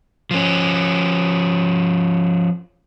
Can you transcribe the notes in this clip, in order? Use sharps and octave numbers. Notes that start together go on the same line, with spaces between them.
F3 C#4